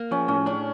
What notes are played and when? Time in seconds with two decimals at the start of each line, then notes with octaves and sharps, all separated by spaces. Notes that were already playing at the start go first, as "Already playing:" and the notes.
Already playing: A#3
0.11 F3 C#4
0.28 A2 C#4
0.46 C#4 D4